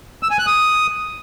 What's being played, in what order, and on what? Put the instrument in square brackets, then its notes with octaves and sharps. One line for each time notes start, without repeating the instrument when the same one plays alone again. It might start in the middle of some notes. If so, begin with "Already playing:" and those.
[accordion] E6
G#5
F#6
D#6